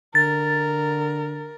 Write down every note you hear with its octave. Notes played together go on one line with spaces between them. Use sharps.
D3 A#4 A6